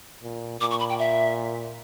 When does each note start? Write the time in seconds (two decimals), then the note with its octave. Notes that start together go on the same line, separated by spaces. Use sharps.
0.23 A#2
0.61 A#2 D6
0.71 C#6
0.80 B5
0.90 G5
0.99 E5